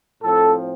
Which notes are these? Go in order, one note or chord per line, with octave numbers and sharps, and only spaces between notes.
A2 F3 C4 A4